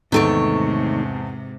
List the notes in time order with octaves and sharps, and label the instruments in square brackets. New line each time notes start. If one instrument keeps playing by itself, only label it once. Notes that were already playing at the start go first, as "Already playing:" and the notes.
[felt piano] E2 A4 D7 [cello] G#2 C3 [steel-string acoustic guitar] D#3 A3 C#5